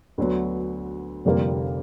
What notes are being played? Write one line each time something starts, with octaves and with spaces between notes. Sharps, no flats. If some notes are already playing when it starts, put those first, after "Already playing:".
D2 D3 F#3 B3
F1 F2 D3 G3 A#3